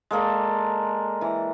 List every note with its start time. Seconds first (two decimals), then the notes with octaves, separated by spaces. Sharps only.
0.11 G#3 A#3 A4 D5
1.21 E3